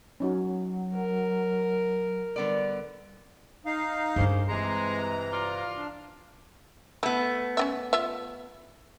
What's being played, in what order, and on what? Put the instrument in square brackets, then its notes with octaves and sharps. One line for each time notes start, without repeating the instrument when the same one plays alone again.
[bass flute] F#3 [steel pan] C#4 D#4 F#4
[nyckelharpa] A#4
[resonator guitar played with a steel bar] D3 B3 D5 [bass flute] G3
[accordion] D#4 F5
[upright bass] G2 D4 [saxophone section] C#3 A#3 C5
[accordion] C3 E3 A#5 [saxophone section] G#3
[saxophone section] F4 D5 F5
[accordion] D4
[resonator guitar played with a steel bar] A3 B3 [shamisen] E4
[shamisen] C#4 D4 E5
F4 E5